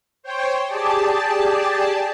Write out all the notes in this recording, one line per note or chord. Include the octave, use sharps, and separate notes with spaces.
C5 C#5 G5
G4 G#4 D5 A5